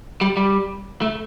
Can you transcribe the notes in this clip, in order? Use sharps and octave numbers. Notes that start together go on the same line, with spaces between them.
G3
G3
A3